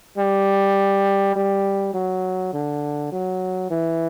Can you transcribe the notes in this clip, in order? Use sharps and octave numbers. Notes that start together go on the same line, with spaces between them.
G3
G3
F#3
D3
F#3
E3